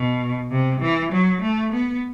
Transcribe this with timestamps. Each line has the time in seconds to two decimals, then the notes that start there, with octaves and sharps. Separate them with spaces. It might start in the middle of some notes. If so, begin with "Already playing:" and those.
Already playing: B2
0.51 C3
0.81 E3
1.12 F#3
1.42 A3
1.72 B3